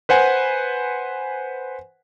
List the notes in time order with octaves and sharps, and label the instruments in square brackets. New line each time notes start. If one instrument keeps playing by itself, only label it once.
[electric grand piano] B4 C5 F#5 G#5